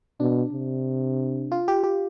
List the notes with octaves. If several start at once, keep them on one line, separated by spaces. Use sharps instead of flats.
B2 D4
C3
F4
G4
G4